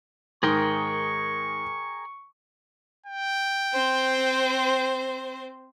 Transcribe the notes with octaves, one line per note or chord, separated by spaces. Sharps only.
G#2 D#3 G#4 A#4 G5 C6 C#6
G5
C4 C5